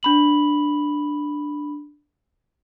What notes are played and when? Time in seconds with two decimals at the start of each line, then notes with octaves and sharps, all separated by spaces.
0.03 D4 B5 F#7